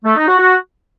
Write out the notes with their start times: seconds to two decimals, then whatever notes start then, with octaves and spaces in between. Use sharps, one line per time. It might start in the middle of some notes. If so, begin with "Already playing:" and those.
0.05 A3
0.16 D#4
0.27 F#4
0.38 F#4